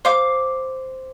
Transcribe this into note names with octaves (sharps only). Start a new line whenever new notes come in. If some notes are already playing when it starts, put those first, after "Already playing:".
C5 F5 D6